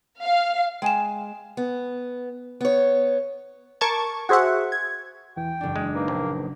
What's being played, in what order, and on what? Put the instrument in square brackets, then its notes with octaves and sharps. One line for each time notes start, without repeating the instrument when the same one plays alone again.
[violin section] F5
[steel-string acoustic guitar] G#3 [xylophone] G5 G#5 E7
[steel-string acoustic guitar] B3
B3 C#5
[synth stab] A#4 A5 C#6 D6 G#6
F#4 G#4 C5 E5 F#5
G#6
[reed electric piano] E2 E3 [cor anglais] G5
[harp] F#1 D4
[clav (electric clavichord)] G#3
[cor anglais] A#3 [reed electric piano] D#4 B4
[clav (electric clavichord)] A#1